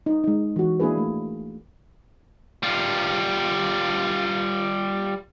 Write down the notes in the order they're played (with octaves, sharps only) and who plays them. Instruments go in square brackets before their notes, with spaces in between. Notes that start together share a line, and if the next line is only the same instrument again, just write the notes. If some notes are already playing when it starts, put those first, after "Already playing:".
[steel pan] D#4
G#3 D#4
E3 F#4
A#3 D4 E4 G#4 B4
A3
[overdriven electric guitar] G3 F4